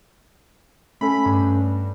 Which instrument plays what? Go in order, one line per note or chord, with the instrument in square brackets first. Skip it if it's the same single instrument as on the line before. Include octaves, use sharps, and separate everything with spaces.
[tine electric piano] A3 C#4 A4 [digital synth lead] B5
[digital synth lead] G2